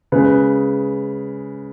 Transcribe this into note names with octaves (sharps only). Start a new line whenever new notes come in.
C#3 G#3 B4